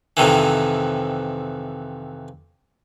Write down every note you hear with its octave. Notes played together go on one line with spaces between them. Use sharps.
F2 C3 D#3 E3